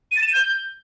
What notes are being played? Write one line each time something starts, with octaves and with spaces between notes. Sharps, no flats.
D#7
A6
E7
D#7
G6